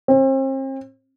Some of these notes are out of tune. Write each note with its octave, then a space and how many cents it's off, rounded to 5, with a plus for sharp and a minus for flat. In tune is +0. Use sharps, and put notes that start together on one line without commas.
C4 +40